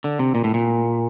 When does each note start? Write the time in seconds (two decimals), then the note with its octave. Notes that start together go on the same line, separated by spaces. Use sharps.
0.04 D3
0.19 C3
0.35 A#2
0.44 A2
0.54 A#2